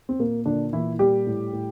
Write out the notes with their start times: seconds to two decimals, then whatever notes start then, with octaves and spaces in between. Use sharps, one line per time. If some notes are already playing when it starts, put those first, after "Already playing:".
0.09 C4
0.19 A#2 A#3
0.46 A#2 D3 D4
0.73 A#2 E3 E4
0.99 A#2 G3 G4
1.27 A2
1.53 A2